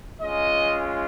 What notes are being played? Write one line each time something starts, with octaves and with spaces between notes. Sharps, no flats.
G#3 C#4 F4 D#5